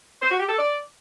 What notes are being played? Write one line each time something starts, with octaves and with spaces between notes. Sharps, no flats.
C5
F#4
G4
A4
D5